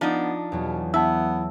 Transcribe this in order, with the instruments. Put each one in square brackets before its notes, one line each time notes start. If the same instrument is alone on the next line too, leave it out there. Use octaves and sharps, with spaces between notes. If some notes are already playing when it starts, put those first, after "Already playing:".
[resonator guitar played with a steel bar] F3 D4 D#4 [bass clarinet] B3
[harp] E2 F#3 [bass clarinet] B2
[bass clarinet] B3 [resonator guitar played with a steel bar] E4 [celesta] A5 E6